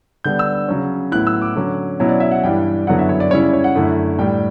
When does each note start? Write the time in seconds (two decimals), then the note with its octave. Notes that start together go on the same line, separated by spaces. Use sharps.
0.24 D3 G3 B3 D4 G6
0.39 E6
0.68 C#3 F#3 C#4
1.12 A2 F#3 B3 E4 F#6
1.27 E6
1.42 D6
1.56 D3 F#3 C#4
2.00 B2 F#3 C#4 E4
2.09 D5
2.20 E5
2.31 F#5
2.43 G2 E3 G3 D4 G5
2.87 F#2 D3 F#3 B3 E4 F#5
2.99 E5
3.09 C#5
3.20 D5
3.31 C#3 G3 C#4 E4 C#5
3.42 D5
3.53 C#5
3.64 F#5
3.75 F#2 D3 A3 E4
4.19 A2 G3 D4 G5